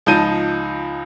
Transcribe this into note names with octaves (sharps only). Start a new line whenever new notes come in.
C#2 F3 D#4 A5 G6 D#7